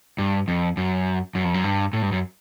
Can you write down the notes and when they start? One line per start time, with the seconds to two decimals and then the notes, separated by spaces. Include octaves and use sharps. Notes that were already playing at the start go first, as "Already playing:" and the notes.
0.18 G2
0.48 F2
0.77 F#2
1.35 F#2
1.44 F2
1.54 F#2
1.64 G2
1.93 A2
2.02 G2
2.12 F#2